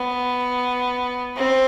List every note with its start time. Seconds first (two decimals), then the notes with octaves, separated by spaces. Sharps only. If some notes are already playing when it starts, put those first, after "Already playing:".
Already playing: B3
1.37 C4